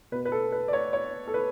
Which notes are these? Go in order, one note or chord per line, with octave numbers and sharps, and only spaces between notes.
B2 B4
B4
A4
B4
D5
C#5
C#5
A4
B4